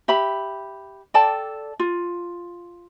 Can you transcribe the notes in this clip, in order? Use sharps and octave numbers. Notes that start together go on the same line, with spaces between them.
G4 E5 B5
A4 D5 G5 A5
F4